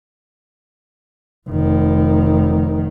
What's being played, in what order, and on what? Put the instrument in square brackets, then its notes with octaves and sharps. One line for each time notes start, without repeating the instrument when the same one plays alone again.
[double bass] F1 D#3